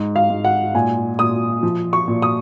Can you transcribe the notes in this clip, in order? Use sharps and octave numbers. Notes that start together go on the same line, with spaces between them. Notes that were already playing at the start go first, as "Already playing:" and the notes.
Already playing: G#2
F5
G#2
F#5
A#2 G#5
A#2 D#6
F3
C#6
A#2
D#6